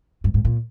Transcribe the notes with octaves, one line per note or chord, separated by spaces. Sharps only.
G2
G#2
A#2